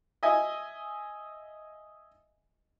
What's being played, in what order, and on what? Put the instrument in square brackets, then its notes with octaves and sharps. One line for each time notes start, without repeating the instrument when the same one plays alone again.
[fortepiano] D#5 E5 G#5